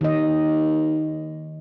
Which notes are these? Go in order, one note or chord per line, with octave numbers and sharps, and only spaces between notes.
D#2 D#3 D#5